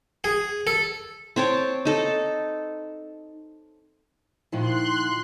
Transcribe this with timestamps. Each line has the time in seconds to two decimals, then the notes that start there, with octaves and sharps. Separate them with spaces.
0.24 G#4
0.67 A4
1.36 C4 C#5 A5 D6
1.85 D#4 A4
4.52 A#2 D#3 F3 E4 C6 F#6